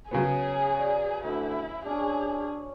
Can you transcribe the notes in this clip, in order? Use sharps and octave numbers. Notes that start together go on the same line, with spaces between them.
C#3 F#3 B3 C#4 G#4
D5 A#5
D2 E4
B2 C#4 D4 G#4